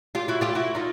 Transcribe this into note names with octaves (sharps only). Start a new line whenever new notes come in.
F4 G4
E4 F#4
F4 G4
E4 F#4
D#4 F4